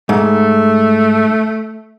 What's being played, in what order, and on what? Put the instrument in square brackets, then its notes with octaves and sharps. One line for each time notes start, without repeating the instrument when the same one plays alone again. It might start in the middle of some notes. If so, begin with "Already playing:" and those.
[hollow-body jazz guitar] G#2 [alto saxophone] A3